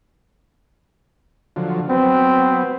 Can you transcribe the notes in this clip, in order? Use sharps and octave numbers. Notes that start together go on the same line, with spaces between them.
D3 F3 F#3
F#3 B3 C4